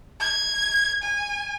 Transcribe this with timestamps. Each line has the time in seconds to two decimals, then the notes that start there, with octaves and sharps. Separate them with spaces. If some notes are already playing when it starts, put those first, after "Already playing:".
0.20 G#6
1.03 G#5